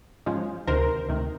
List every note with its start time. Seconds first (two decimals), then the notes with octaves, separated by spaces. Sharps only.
0.26 G#2 F3 G#3 C#4
0.67 D2 C3 D#3 A#4 C5
1.09 D2 C3 D#3